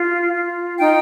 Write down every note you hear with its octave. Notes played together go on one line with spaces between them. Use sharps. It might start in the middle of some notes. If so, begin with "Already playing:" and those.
Already playing: F4
F4
D#4 G5